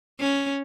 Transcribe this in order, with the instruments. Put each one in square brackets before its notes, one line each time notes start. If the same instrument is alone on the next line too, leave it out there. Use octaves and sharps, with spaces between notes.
[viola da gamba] C#4